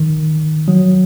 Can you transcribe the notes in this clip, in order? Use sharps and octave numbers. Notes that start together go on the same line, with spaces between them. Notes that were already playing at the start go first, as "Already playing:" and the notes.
Already playing: D#3
F#3